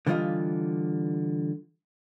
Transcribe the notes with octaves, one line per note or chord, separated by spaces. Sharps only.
D3 E3 G3 F4 D#5 F5